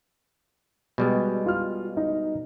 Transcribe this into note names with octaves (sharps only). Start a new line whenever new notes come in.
B2 G3 G#3
F4 F6
D#4